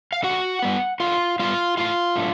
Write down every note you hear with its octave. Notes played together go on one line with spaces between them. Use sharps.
F5
D3 F#4 F#5
G3 B3
D3 F4 F5
G3 B3 F4 F5
A2 F4 F5
F#3 A3 D4